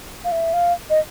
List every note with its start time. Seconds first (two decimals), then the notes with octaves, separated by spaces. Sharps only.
0.25 F5
0.32 E5
0.53 F5
0.90 D#5